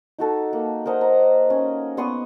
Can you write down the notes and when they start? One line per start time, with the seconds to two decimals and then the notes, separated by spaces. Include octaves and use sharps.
0.19 D#4 F#4 A4
0.53 A#3
0.86 A#4 C5 D#5 F#5
1.01 A#5
1.50 C#4
1.97 B3 C6 C#6 D#6